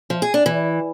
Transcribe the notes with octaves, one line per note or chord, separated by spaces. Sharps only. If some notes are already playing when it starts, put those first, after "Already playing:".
F3
G#4
D4
E3